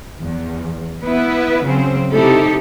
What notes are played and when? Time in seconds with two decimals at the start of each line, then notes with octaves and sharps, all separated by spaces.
0.20 E2
1.02 B3 E4 B4
1.63 C#3 F#3 C4
2.12 C3 D#4 E4 G4 A4